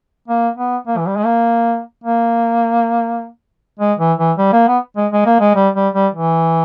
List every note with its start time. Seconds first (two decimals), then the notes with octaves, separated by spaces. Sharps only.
0.28 A#3
0.57 B3
0.87 A#3
0.98 E3
1.07 G3
1.17 G#3
1.26 A#3
2.04 A#3
3.79 G#3
3.99 E3
4.19 E3
4.38 G3
4.53 A#3
4.68 B3
4.97 G#3
5.12 G#3
5.26 A#3
5.40 G#3
5.55 G3
5.75 G3
5.94 G3
6.14 E3